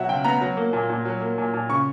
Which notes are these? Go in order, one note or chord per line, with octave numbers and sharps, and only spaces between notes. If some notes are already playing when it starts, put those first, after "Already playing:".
Already playing: B2 F#3 E5 F#5
C#2 G5
B3 A#5
F#3
A#3
A#2
A#2
F#3
A#3
A#2
A#2
C#3 C#6